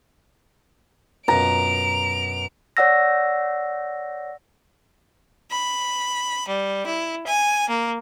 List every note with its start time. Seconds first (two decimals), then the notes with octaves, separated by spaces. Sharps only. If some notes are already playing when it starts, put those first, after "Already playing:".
1.28 F#2 B2 A#5 D7 F7
2.77 C#5 D5 F#5 E6 A#6
5.50 B5
6.47 G3
6.87 E4
7.26 G#5
7.69 A#3